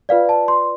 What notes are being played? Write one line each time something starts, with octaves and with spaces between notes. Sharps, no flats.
F4 B4 D5 F5
A5
C6